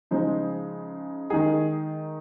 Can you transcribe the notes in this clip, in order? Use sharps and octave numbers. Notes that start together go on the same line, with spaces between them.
C#3 F3 G#3 D#4 C5
D#3 G#3 D#4 G#4